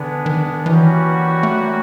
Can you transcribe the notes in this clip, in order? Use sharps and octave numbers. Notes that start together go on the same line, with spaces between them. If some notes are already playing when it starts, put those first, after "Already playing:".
Already playing: D3 G#3 B3 D4
D#3
E3 G3 A#3 C#4 F#4
A3